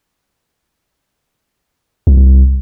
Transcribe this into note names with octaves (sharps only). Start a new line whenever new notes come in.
C2